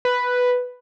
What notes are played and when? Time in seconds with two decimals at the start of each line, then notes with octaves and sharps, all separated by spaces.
0.05 B4